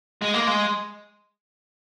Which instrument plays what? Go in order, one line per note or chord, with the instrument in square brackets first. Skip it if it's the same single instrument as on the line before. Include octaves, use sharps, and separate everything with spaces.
[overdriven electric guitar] G#3
A#3
G#3